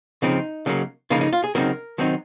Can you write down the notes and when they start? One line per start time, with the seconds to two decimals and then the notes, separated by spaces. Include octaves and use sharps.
0.22 C#3 F3 C4 D#4
0.66 C#3 F#3 A#3
1.10 C#3 F3 A#3 D#4 F4
1.21 D#4
1.33 F4
1.44 G#4
1.55 C#3 F#3 C4 D#4 A#4
1.98 D#3 F#3 C4 D#4